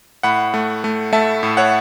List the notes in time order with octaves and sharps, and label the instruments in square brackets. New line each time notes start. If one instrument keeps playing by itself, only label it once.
[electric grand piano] A2 F#5 B5
A3
A3
A3 E5 A5
A2
C#5 F#5